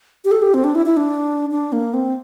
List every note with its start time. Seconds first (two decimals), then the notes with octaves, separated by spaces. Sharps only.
0.25 G4
0.31 A4
0.42 G4
0.54 C4
0.64 D4
0.75 E4
0.86 E4
0.97 D4
1.51 D4
1.73 A#3
1.94 C4